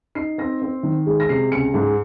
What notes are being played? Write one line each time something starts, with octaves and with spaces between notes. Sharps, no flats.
D#4 C7
C4 A#6
C4
D#3
G#3
A#6
C3 C7
C#2 C#7
G#2